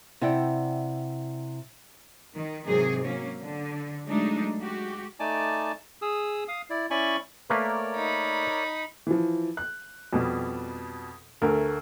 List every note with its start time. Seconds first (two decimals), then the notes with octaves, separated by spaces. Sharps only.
0.21 C3 E4 D5 F#5 G5
2.35 D#3
2.65 G#2 C3 D#3 E3 F#3 G#4
3.03 F#3 A#3 C#4
3.40 D3
4.06 F#3 G#3 A3 D4 D#4
4.60 G#3 F#4 G4
5.20 A3 D#4 D5 G#5 A5 D6
6.02 G#4 D#6 E6
6.48 F5 D#6
6.70 E4 D5
6.91 C#4 E4 D5 G#5 B5 C#6
7.50 A3 A#3 A#4 B4 C#5 D5
7.95 D#4 B5
9.07 E3 F3
9.57 F#6
10.13 F2 B2 G3
11.42 D2 A3 A#4